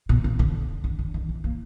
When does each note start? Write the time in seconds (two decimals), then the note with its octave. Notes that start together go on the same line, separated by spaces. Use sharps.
0.09 B2
0.24 C#3
0.39 D3
0.84 D3
0.99 D3
1.14 D#3
1.29 E3
1.44 A#3